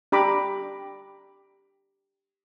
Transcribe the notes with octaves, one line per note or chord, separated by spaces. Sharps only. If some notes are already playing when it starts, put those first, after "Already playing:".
D4 G4 A#5 B5 D6